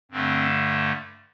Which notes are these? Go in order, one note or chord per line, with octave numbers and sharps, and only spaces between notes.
G2 D3 A3 C4